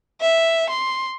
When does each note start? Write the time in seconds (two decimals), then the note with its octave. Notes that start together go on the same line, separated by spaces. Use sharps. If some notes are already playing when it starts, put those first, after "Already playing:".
0.21 E5
0.70 C6